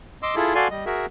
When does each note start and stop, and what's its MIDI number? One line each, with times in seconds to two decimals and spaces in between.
0.23 0.35 75
0.23 0.35 84
0.23 0.35 86
0.23 0.35 88
0.36 0.54 64
0.36 0.54 65
0.36 0.54 68
0.36 0.54 69
0.55 0.68 66
0.55 0.68 69
0.55 0.68 74
0.55 0.68 77
0.55 0.68 80
0.55 0.68 84
0.71 0.85 55
0.71 0.85 75
0.86 1.06 66
0.86 1.06 68
0.86 1.06 70
0.86 1.06 76